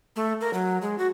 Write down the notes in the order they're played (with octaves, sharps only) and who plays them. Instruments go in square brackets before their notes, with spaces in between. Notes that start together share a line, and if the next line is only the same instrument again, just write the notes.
[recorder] A3
A#4
F#3
G#3
F#4